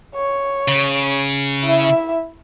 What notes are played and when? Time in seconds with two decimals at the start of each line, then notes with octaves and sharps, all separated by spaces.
0.15 C#5
0.68 C#3
1.65 E4 E5